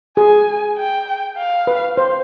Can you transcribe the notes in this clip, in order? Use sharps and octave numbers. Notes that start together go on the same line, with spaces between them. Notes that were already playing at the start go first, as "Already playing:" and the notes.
G#4 G#5
G5
F5
B4
C5